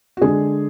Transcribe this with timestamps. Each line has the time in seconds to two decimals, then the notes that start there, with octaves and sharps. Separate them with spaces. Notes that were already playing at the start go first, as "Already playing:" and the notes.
0.17 F#4
0.22 D3 G#3 D4 G#4